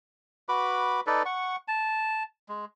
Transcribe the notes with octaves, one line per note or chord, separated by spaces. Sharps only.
F#4 B4 B5 D6
D#4 A4 B4 D5
F#5 C#6
A5
G#3